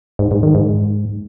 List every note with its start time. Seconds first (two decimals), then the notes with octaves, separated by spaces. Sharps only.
0.19 G#2
0.31 G#2
0.43 D#3
0.55 G#2